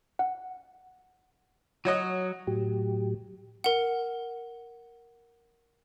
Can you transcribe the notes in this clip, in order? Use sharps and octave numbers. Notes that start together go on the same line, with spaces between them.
F#5
F#3 F#4 C#5 D#5
A2 F#3 G4
A#4 F#5